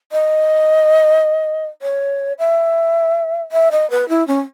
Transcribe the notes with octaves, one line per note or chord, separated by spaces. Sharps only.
D#5
C#5
E5
E5
D#5
B4
E4
C#4